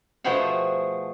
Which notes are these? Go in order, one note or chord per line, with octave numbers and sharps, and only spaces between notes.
B2 F3 A3 G#4 C5 F#5